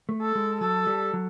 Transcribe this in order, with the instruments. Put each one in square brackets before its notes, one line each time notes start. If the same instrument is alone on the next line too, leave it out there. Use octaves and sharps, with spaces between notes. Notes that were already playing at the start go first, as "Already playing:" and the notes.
[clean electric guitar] A3
[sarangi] A4
[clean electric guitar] G#3
[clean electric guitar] F#3 [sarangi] A4
[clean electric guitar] G3
F#3